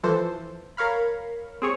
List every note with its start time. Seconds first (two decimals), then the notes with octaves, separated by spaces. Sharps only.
0.03 E3 F3 A4 C5
0.77 A#4 C#5 F5 B5
1.62 C4 G#4 C#5